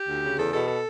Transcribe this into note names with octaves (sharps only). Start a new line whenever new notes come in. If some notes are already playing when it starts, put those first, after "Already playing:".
Already playing: G4
D2
C#3
E2 A4
B2 A4
A4